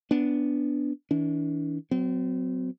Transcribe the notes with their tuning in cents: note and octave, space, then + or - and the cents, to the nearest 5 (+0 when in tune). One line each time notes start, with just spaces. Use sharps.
B3 +0 D4 -10
E3 -45 D4 -40
F#3 +0 C4 -40